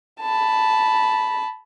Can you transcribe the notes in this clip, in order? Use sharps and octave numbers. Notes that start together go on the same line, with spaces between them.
A5 B5